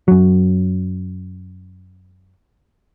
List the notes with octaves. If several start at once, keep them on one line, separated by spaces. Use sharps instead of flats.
F#2 F#3